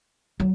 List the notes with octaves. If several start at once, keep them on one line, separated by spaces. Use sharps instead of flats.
F#3